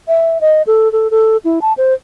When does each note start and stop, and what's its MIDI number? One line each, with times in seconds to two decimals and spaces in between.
0.08 0.41 76
0.41 0.62 75
0.67 0.91 69
0.92 1.10 69
1.11 1.37 69
1.45 1.59 64
1.62 1.73 81
1.78 1.94 72